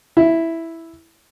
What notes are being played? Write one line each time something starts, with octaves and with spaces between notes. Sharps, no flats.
E4